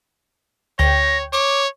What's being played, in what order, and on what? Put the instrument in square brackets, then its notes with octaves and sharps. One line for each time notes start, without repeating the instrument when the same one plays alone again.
[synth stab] D2 G5 G6 [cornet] C#5 [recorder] A#6
[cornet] C#5 [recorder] D6